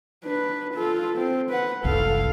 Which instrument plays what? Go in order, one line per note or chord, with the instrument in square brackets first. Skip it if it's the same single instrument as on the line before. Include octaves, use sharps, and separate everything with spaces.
[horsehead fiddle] D4 B4
F4 A4
C4
B4 F#5
[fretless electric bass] F#1 C2 [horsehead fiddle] A4 F5